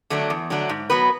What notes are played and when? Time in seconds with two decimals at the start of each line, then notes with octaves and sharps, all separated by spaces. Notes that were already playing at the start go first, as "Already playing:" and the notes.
0.10 D3 F#3 A3 D4
0.30 E2
0.50 D3 F#3 A3 D4
0.69 G#2
0.90 F#3 B3 F#4 B4